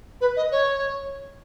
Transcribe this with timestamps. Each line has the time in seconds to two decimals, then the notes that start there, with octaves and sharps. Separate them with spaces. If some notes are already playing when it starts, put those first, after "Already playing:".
0.21 B4
0.36 D#5
0.52 C#5